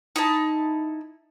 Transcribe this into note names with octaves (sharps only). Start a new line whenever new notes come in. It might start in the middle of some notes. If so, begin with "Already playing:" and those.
D#4 E4 A5